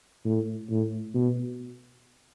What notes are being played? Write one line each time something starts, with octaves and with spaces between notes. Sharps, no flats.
A2
A2
B2